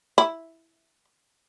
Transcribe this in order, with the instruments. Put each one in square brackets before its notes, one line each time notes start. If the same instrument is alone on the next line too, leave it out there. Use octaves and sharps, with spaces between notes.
[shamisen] E4